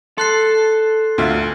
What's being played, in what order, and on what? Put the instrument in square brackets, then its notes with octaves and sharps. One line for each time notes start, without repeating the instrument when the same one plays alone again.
[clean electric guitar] A4 [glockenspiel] C6 F#6 C7
[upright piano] D2 F4 E5